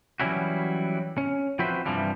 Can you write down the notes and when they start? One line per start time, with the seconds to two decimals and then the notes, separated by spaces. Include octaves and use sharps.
0.20 E3 F#3 G3 C#4 E4 F#4
1.18 C#4
1.59 F3 C4 F#4 B4 C5 E5
1.86 G2 C3 E3 F3 G3